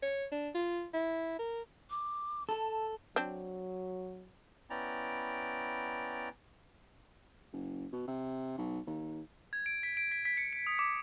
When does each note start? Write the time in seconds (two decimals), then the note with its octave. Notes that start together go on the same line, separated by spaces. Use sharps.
0.02 C#5
0.32 D4
0.55 F4
0.94 E4
1.39 A#4
1.90 D6
2.49 A4 A5
3.16 F#3 C4 D4
4.70 B3 C#4 E4 D5 G5 A#5
7.53 F#1
7.93 B2
8.08 C3
8.58 B1
8.87 D#2
9.53 G#6
9.66 D7
9.83 B6
9.97 D7
10.12 B6
10.25 B6
10.37 C#7
10.53 D7
10.67 D#6
10.79 D6